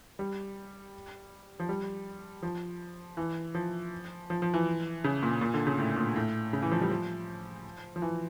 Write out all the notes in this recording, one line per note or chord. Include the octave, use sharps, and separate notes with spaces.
G3
F3
G3
F3
E3
F3
F3
F3
E3
C#3
A#2
A#2
D3
C#3
A2
A#2
A2
C#3
E3
F3
G3
F3
F3
E3